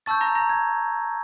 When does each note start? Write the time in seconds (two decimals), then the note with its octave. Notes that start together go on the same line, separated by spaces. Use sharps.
0.06 A5 C#6 E6 G6 A6
0.21 A#5 A#6
0.35 A#5 A#6
0.49 G#6